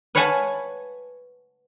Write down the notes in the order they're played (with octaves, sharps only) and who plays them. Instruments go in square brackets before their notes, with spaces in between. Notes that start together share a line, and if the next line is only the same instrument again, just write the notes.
[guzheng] B4 C#5 F5 F#5 G#5 A5